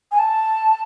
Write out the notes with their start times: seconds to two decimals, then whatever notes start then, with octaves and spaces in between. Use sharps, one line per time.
0.12 G#5
0.19 A5